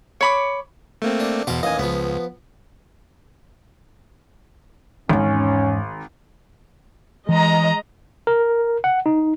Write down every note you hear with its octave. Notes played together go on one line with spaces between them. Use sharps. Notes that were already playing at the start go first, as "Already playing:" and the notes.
C#5 B5 D6
A3 A#3 C4
D4
E2 B2 C5 F5 F#5
A1 D#2 D#5 F5 G#5
C#2 F3 B3
G#1 E2 G#2 C#4
E3 G#3 D#5 A#5
A#4
F#5
D#4